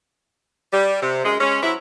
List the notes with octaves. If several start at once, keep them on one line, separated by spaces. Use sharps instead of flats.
G3
C3
F#2 G#3
G#3 C#4
F#3 C4 E4